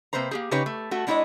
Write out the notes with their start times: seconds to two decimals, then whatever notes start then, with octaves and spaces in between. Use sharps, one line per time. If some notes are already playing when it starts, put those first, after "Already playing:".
0.13 C3 A#3 B4 C5 A#5
0.31 A#3 G4 G#4
0.51 C#3 D#4 G4 B4 C#5
0.66 A3
0.91 A3 F#4
1.07 G#3 D4 E4 F4 C#5 D#5